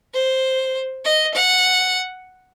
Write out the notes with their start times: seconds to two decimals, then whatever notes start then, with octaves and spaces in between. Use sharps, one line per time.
0.14 C5
1.05 D#5
1.34 F#5